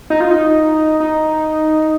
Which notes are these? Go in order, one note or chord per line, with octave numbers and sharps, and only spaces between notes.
D#4
F4
D#4
D#4